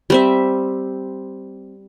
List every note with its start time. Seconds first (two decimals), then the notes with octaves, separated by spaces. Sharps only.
0.10 G3 C4 E5